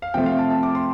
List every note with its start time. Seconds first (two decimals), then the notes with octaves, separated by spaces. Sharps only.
0.02 F5
0.14 C3 F3 A3 C4 G5
0.26 F5
0.39 A5
0.50 A5
0.63 D6
0.75 C6